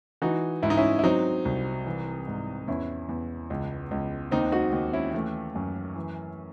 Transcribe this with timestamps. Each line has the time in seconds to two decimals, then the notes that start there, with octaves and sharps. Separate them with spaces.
0.22 E3 D#4 F#4
0.63 G#2 E4
0.70 D#4
0.77 C#4 E4
0.99 E4
1.04 F#3 C4 D#4
1.45 C2
1.86 E3
2.27 G#2
2.68 E2 C#4 E4
3.09 E2
3.50 C#2
3.91 C#2
4.31 D#2 C4 D#4
4.52 D#4 F#4
4.72 D#2
4.93 C#4 E4
5.13 E3 A3 C#4
5.55 F#2
5.96 E3